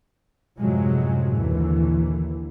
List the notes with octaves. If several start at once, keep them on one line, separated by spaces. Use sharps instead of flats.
F#2 A2 C3 F3 F#3 G#3
A#1 D#2 D3 E3